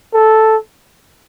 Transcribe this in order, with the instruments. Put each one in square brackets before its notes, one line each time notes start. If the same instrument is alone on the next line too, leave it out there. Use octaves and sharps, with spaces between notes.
[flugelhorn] A4